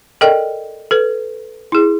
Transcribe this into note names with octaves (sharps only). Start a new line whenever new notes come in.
A4 A#4 D5 D#5 G5
A4 B4
E4 G#4